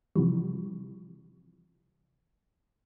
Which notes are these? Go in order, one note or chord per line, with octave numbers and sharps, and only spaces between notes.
C3 E3 F3 G3